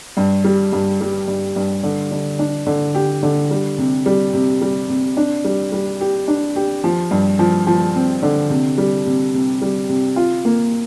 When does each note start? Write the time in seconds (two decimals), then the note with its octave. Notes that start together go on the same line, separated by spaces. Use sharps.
0.17 G2
0.44 G3
0.73 G2
1.01 G3
1.28 G2
1.56 G2
1.83 D3
2.11 D3
2.39 D4
2.67 D3
2.95 G4
3.23 D3
3.51 G3
3.78 C3
4.06 G3
4.34 C3
4.61 G3
4.89 C3
5.17 D4
5.44 G3
5.72 G3
6.01 G4
6.28 D4
6.56 G4
6.84 F3
7.11 G2
7.39 F3
7.67 F3
7.95 C4
8.23 D3
8.50 C3
8.78 G3
9.06 C3
9.34 C3
9.62 G3
9.89 C3
10.16 F4
10.45 A#3